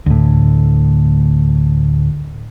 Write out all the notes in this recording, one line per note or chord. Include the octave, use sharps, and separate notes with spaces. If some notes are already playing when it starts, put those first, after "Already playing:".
D2 A2